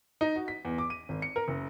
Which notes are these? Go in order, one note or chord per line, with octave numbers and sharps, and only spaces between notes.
D#4
F#4
B6
E2
D6
D#7
G#1
C#7
A#4
F#1